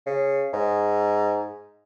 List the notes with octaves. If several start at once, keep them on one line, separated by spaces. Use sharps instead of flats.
C#3
G#2